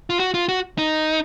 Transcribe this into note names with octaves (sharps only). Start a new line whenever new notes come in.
F4
F#4
F4
F#4
D#4